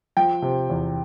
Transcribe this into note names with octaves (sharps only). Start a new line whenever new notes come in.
F3 G5
C3
E2